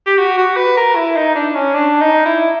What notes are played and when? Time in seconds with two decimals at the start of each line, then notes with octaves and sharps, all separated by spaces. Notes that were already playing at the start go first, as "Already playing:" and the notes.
0.07 G4
0.18 F#4
0.38 F#4
0.56 B4
0.77 A#4
0.95 E4
1.16 D#4
1.35 D4
1.55 C#4
1.75 D4
2.01 D#4
2.26 E4